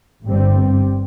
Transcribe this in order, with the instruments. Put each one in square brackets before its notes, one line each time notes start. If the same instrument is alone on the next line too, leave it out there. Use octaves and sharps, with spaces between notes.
[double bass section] G1 G2 G3 C4